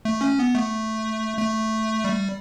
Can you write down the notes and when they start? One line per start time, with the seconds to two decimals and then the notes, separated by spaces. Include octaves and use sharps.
0.05 A3
0.21 C#4
0.39 B3
0.55 A3
1.38 A3
2.04 G3